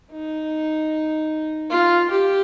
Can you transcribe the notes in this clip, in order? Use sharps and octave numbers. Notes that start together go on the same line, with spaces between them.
D#4
F4
G4